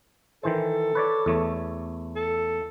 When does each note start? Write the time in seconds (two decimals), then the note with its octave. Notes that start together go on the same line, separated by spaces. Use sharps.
0.43 D#3 E3 A4 C5
0.95 B4 C#5 D5
1.26 E2 A3 C#5
2.16 A4